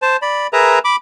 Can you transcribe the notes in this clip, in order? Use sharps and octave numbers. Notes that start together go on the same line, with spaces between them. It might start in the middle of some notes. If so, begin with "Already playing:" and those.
C5 A5
D5 B5
G#4 A#4 B4 E5 A#5
B5 D6